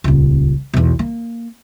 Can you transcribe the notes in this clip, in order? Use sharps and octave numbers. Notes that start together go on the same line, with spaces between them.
D#1 C#2
B1 E2
A#3